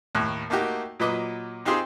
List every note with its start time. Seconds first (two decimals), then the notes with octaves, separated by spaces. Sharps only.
0.15 D#2 A2 F#6
0.50 A3 A#3 D#4 F#4 G4
1.00 A#2 F#3 B4 D#5 D6
1.65 C4 D#4 F4 G4 G#4 C5